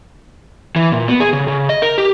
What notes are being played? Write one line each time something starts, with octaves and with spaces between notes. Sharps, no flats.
E3
A#2
B3
G#4
C#3
C#3
D#5
A#4
G4